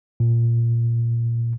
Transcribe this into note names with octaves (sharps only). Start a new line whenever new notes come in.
A#2